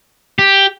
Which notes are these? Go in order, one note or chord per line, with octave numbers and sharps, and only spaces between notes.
G4